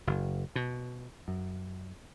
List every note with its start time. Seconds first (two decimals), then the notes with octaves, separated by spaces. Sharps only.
0.07 F#1
0.56 B2
1.28 F#2